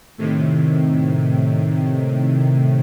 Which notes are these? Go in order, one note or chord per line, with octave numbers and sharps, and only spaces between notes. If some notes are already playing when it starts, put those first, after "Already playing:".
A2 C3 D#3